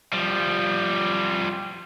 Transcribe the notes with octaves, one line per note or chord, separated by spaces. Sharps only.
F3 G3